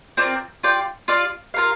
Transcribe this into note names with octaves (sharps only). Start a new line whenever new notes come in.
C4 F4 A#4 D5
F4 D5 G5
F4 D5 F5
F4 A#4 F5